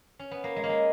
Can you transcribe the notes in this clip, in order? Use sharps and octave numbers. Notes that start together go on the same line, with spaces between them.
C#4
B3
A#3
G#3
A#3
G#3